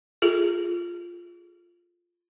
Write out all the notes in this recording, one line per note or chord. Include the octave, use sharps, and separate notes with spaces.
F4 G#4 A4